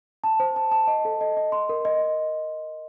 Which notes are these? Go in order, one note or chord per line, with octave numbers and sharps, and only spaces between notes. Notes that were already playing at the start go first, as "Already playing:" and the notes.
A5
C5
A5
A5
D#5
A4
D#5
D#5
C6
A#4
D#5